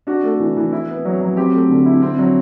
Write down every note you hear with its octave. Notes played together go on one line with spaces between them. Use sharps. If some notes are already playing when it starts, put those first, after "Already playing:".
D4 F#4
A3
E3
E3
E4
B3
F#3
F#3
C4 G4
A3
D3
E4
C4
F#3